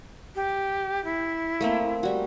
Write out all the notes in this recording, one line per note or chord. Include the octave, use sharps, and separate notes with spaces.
G4
E4
A3 A#3 C4
G3 F#4